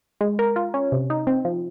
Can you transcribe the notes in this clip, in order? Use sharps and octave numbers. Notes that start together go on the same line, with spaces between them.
G#3
A#4
F4
C#4
C3
D#4
C4
F3